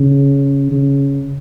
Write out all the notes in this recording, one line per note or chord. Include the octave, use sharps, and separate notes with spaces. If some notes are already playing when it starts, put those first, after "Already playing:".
Already playing: C#3
C#3